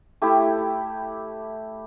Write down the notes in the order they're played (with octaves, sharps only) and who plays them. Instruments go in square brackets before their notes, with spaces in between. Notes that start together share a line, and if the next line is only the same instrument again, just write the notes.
[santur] A3 E4 G4